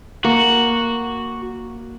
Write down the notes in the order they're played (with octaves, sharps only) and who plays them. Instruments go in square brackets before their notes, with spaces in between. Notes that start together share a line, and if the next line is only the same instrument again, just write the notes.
[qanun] A#3 [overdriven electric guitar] F#4